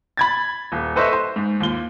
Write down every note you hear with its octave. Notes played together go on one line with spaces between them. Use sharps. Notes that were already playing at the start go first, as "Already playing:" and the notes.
B5 G#6 A6
D#1
A4 B4 C5 D#5 E5 C#6
C5
G#2
D#2 F4 G7